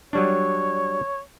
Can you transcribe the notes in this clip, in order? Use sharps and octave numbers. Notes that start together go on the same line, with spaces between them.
F#3 G3 D4 C#5